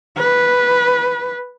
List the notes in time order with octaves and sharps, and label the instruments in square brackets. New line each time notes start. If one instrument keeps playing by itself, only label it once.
[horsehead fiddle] B4